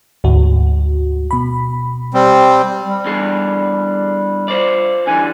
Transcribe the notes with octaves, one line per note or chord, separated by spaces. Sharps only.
D2 G#2 F#4
B2 B5
G3 C4
G3
E2 D3 G#4
F4 C5 D5
D3 E3 G3 G#5